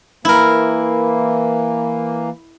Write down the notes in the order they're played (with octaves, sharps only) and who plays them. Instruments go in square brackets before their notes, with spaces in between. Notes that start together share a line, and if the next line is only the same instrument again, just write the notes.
[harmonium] E3 A#3 [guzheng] E4 A#4